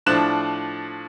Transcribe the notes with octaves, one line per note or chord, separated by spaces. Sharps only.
A2 F3 D4 F#6 E7